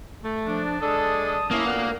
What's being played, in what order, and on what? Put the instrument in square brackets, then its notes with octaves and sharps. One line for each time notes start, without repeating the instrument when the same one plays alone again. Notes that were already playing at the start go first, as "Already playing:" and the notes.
[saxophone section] A3
[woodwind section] F3 D4
[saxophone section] G#3 D4 A4 [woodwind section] A5 D#6
[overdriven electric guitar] A#3 [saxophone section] C#4 E4
[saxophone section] D2 A#2 B3